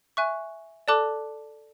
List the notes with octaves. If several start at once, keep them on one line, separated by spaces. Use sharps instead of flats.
E5 G#5 C#6 F#6
A4 D5 A5 D6 F#6